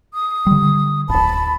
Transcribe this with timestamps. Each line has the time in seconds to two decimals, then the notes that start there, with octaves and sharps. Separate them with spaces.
0.14 D#6
0.47 D3 G3
1.09 D1 G1 A5 B5